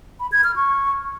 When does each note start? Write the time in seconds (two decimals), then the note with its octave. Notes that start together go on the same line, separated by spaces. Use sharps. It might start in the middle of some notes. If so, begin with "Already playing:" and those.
0.20 B5
0.32 G#6
0.44 F6
0.56 C#6